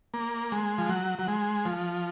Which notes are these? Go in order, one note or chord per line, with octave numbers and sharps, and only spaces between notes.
A#3
G#3
F3
F#3
F#3
G#3
F3